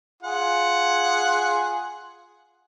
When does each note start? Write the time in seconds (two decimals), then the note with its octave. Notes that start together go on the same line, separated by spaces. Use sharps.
0.23 F4 G#4 F#5